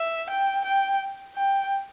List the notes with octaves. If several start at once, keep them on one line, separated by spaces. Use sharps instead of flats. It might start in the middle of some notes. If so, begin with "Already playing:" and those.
Already playing: E5
G5
G5
G5